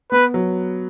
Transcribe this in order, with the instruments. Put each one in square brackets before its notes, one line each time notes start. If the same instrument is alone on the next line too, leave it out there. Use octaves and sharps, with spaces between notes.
[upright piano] B3 [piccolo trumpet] B4
[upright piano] F#3